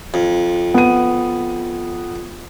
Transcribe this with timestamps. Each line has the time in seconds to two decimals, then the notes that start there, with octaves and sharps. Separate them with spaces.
0.14 F2
0.74 B3 D#7